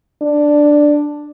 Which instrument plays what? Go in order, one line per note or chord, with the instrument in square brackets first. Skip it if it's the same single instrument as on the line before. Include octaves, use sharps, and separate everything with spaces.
[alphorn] D4